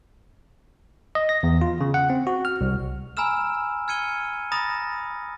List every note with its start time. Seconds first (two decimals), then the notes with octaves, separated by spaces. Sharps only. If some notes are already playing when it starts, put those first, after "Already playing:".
1.15 D#5
1.29 A#6
1.43 E2
1.61 F4
1.81 C#3
1.94 F#5
2.10 C4
2.27 F#4
2.45 F6
2.61 C2
3.17 G#5 A#5 B5 E6 F6 E7
3.88 F6 G#6 C#7 D#7 G7
4.52 A#5 B5 D#6 A6 A#6